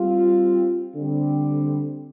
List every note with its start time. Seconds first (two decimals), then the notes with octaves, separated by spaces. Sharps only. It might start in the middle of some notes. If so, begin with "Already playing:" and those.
Already playing: G3 C4 F4
0.94 D3 G3 C4